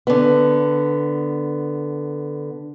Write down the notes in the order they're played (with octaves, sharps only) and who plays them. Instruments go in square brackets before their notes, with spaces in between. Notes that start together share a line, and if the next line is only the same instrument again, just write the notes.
[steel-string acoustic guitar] D3 B3